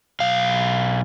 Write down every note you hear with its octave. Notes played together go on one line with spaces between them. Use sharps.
B1 F5